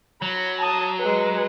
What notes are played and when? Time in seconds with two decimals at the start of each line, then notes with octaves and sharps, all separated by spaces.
0.22 F#3 B5
0.61 A5 D#6
0.99 G#3 B4